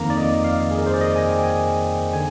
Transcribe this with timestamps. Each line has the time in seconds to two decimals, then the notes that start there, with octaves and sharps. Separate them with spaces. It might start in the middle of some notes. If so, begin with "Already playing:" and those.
Already playing: F2 D#3 A#3 A#5
0.10 D5
0.17 D#5
0.44 F5
0.71 G#4
0.78 A#4
0.86 C5
0.94 D5
1.01 D#5
1.16 G#5
1.30 G5
1.44 G#5
2.13 D3 G#5